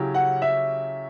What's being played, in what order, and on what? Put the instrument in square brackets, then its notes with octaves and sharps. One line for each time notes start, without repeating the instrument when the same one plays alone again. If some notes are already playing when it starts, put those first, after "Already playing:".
Already playing: [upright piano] C#3 F#3 C#4 E4 G4
[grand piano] F#5
E5